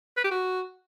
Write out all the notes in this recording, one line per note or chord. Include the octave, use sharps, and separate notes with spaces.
B4
G4
F#4